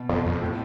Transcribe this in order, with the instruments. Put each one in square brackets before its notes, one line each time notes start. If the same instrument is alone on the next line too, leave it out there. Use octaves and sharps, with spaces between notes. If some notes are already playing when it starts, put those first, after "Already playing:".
Already playing: [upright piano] B2
[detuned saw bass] F2
F2
[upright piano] A2